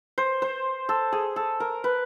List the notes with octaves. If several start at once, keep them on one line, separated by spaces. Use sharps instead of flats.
C5
C5
A4
G#4
A4
A#4
B4